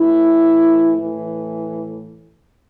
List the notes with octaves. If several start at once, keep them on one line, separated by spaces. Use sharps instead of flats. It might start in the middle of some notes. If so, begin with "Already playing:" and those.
Already playing: A2 E3 E4
A2 E3